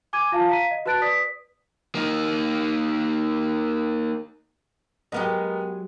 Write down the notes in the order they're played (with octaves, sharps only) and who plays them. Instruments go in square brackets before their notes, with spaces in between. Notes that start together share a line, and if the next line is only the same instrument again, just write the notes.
[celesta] G#5 D6 G#6 D#7
F4 F5 A5
F5 A#5 B6 D#7
D#5
F#4 B4 A5 F#6 A6 D7
B4 D5 D#6 B6
[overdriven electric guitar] A#3 D#4
[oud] F#3 G#3 G4 [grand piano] B3 A#4 D#5